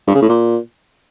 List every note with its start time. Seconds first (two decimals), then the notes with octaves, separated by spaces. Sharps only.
0.07 G2
0.14 C#3
0.22 A2
0.29 A#2